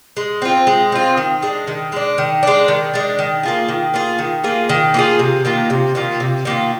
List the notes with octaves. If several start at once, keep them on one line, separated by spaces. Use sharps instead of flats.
G#3
C4 F4
G#3
C4 F4
D#3
G#3 D4
D#3
G#3 D4
D#3
G#3 D4
D#3
G#3 D4
D#3
A#3 F4 G#4
D#3
A#3 F4 G#4
D#3
A#3 F4 G#4
D#3
A#3 F4 G#4
C3
D#3 A#3 F4
C3
D#3 A#3 F4
C3
D#3 A#3 F4